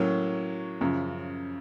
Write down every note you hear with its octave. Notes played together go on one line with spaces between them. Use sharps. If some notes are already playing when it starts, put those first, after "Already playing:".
Already playing: A2 F#3 A#3 C#4
F#2 C#3 F3